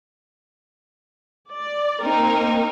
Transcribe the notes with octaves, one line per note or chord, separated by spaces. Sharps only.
D5
A#3 C4 D#4 A#4